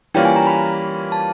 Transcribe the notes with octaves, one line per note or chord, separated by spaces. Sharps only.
E3 G3 A#3 C#4 F4 G5
G#5
A#5
B5
A5